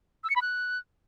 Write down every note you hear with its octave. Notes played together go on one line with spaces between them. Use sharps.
E6
C#7
B5
F#6